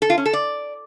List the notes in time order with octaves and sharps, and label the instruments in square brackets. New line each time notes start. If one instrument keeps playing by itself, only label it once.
[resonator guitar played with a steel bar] A4
F4
C#4
A4
D5